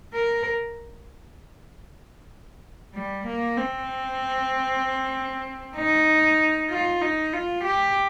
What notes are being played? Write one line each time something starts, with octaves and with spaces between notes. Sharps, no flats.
A#4
G3
A#3
C4
D#4
F4
D#4
F4
G4